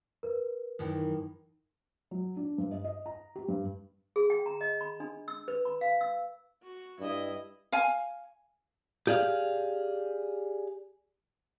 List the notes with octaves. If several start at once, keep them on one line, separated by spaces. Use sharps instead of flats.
A#4 B4
F#2 D#3 E3
F#3
D4
G2
D#5
D#5
A#5
G4
G2
G#4
G5
A#5
D#5
B5
D4
E6
B4
B5
F5
E6
F#4
G2 E4 D#5
F5 G#5
G4 G#4 D5 F5